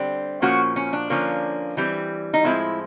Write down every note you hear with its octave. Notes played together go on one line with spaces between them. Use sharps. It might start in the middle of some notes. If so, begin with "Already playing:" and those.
Already playing: D3 G3 C4
A#2 F3 A#3 C#4 F#4
C#4
D4
D3 F3 A#3 C#4
E3 G3 C4
D#4
A2 F3 G#3 C4 E4